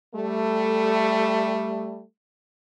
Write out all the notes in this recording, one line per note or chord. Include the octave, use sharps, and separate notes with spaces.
G3 A3